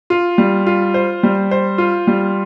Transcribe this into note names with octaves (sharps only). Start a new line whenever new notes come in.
F4
G3
F4
C5
G3
C5
F4
G3